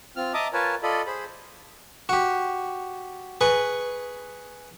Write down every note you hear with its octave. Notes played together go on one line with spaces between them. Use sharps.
C4 F4 F6
D#5 E5 A5 A#5 D6 D#6
F4 A#4 B4 C#5 G#5 A5
F4 A4 D5 D#5 B5
G#4 C5 B5
F#4 G4
G#4 B4 C#6